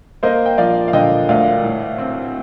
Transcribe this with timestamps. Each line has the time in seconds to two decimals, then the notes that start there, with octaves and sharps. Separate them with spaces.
0.23 A#3 C5 D#5
0.46 G5
0.58 F3 D5 F5
0.88 F5
0.93 D3 D#5 G5
1.29 D2 D5 F5
1.64 A2
1.98 C4